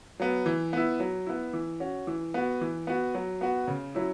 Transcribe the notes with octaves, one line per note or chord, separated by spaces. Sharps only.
F#3 B3
E3
B3 E4
F#3
B3 E4
E3
C#4 F#4
E3
B3 F#4
E3
B3 F#4
F#3
B3 F#4
C#3
F#3 C#4 E4